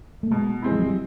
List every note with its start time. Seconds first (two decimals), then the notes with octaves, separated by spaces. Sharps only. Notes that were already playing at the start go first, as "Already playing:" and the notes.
0.23 A3
0.31 B2 G#3
0.62 G#3 C4 E4
0.72 F3
0.79 F#3
0.86 G3